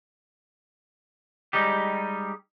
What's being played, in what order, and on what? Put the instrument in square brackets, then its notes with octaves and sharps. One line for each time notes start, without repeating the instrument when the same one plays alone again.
[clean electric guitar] G3 G#3 D#4 G4